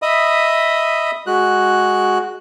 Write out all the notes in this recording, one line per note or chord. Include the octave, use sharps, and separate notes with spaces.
D#5 E5 B5 D#6
G#3 F#4 F#6